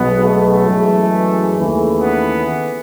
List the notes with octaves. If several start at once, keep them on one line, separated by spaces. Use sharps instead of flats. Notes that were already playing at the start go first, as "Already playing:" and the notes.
Already playing: B1 B2 G#3 B3
A3
F#2 E3 G#3
D#2 C#3 E3 A3
B3